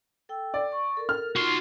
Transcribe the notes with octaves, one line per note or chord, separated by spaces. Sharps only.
A4 G5 E6
D5
C#6
A4 A#4
F6
D#4 F4 F#4 C6